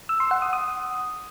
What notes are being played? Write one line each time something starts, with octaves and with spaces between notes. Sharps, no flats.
E6
C6
F#5
D#6
D#6